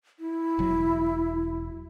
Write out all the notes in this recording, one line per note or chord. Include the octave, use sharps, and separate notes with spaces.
E4
E1 F#3